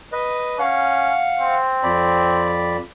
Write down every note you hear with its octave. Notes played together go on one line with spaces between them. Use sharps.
B4 D#5
C#4 F5 F#5
C4
F2 D5 B5